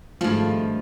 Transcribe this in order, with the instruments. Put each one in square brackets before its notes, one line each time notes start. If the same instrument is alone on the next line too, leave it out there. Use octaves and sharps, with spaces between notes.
[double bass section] G#1 [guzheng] G2 F3 [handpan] G#3 A3 [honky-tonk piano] F4